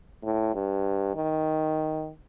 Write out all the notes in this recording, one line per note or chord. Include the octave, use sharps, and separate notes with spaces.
A2
G2
D#3